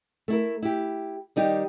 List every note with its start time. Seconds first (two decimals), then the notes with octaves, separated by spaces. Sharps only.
0.28 A3 E4 A#4
0.62 E4 G4
1.36 D#3 G3 D#4 G4